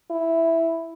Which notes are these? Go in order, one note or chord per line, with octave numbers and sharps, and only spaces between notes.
E4